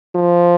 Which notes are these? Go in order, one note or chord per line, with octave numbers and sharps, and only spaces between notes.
F3